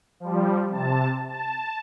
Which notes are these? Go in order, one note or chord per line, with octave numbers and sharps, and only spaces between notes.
F3 G3
C3 A5
A5